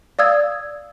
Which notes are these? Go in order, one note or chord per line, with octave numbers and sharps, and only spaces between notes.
D5 F5 D#6 E6 G#6